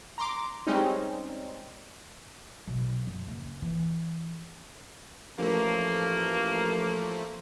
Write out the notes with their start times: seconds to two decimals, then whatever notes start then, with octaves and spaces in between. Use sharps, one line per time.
0.18 A#5 C6 D6
0.67 G3 G#3 C4 C#4 D#4
2.67 B1
3.07 F#2
3.28 F#1
3.62 E3
5.38 A1 F3 A3 A#3